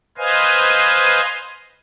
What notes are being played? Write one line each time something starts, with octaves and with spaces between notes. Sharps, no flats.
B4 C5 D#5 F5 G#5